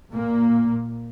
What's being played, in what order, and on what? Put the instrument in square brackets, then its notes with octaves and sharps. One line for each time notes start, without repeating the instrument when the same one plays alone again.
[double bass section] A#2 A#3